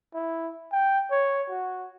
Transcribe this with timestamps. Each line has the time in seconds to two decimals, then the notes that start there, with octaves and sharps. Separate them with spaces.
0.14 E4
0.72 G5
1.11 C#5
1.50 F#4